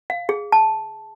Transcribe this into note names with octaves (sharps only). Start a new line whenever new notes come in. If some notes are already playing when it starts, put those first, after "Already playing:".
F5
G#4
A5